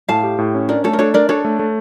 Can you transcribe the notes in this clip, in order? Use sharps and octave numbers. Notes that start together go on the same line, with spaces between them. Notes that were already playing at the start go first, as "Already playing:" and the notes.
A2 F5 A5
G4
A2
C#4
D4 A#4 D5
A3 A4 C#5
A#4
D4 A4 C#5
D4 A#4 D5
D4 A4 C#5
A3
A3